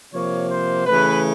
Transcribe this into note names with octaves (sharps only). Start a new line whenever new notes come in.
C3 F3 A#3 C#5
C5
C#3 E3 A3 B4